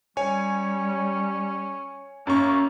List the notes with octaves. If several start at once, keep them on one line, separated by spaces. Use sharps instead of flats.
G3 C#4 C#5 G#5
F#2 A#3 C#6